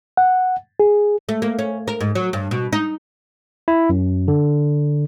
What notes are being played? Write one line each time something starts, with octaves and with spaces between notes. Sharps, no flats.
F#5
G#4
A3
A#3
C#4
A#4
G#2
F#3
G2
B2
D#4
E4
F#2
D3